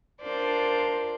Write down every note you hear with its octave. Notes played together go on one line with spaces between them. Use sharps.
D4 F4 A#4 C5 D5